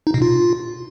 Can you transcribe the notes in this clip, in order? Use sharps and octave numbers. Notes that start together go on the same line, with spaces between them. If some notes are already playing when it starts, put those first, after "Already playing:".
D#4
B2
F4